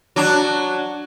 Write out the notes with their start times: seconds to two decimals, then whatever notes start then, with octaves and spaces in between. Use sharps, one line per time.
0.16 F#3 D4